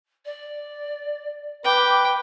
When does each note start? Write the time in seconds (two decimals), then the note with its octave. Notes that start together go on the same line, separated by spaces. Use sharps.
0.25 D5
1.65 B4 G5 D6